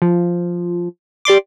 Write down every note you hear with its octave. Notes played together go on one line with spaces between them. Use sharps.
F3
G4 D5 C6 D6